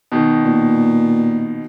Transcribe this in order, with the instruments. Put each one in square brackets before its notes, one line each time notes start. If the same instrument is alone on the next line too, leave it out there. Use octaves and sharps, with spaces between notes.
[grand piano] B2 D#3
[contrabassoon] A#2